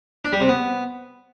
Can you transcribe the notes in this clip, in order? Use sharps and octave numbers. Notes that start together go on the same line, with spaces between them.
D4
G3
C3
B3